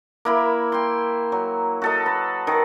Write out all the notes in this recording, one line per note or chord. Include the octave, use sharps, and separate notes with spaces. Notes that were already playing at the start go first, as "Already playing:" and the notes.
A#3 E4 B5
G5 C6
F#3
F#4 A4 D#5
B4
D#3